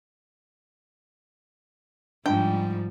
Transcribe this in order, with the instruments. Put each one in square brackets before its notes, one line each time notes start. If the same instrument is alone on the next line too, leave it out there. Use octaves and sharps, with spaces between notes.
[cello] G#2 [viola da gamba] F3 G3 [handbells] D4 [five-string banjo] G5